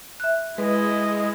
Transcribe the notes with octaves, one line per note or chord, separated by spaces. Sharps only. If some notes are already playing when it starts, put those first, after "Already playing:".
E5 F#6
G#3 E4 B4 D#5